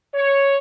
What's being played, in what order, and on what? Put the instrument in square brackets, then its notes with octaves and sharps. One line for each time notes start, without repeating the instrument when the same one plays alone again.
[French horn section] C#5